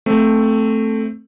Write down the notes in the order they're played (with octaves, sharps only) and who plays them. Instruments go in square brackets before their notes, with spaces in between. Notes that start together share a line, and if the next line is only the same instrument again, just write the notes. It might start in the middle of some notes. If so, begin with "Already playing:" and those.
[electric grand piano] A3 C4